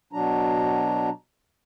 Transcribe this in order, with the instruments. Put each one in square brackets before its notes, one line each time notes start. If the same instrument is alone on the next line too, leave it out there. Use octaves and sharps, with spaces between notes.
[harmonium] B2 F#3 D4 A#5